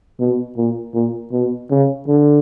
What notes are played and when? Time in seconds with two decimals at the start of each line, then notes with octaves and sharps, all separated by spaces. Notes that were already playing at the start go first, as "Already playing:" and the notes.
0.20 B2
0.57 A#2
0.94 A#2
1.32 B2
1.71 C#3
2.07 D3